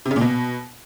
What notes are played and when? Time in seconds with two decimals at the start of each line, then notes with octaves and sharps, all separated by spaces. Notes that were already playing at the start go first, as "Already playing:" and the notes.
0.06 C3
0.11 C#3
0.16 A#2
0.21 B2